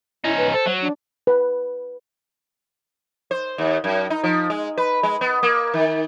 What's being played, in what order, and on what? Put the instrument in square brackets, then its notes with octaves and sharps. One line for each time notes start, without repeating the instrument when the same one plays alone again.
[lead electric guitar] C#4 D#4 [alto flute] E4
[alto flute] B4
[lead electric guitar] A4 [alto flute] C5
[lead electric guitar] F#3
[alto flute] D4
[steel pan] B4
[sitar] C5
D#2
F#2
D#4
F3
G#3
B4
G#3
B3
A#3
D#3